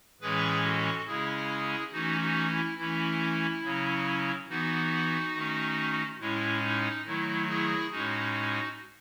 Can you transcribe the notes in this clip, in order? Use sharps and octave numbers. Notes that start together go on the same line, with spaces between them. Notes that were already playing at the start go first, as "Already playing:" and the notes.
A2 E3 G#3 C#4 G#4 B4
F#4 A4
C#3 G#3 C#4 E4 G#4
E3 A3 C#4 D#4 F#4
D#4 F#4
E4
E3 A3 C#4 E4
C#3 F#3 C#4
E3 B3 D#4 F#4
D#3 A3 C#4
A2 G#3 C#4 E4
D#4
D#3 F#3 A3 E4
E4 G#4
A2 G#3 C#4 D#4 F#4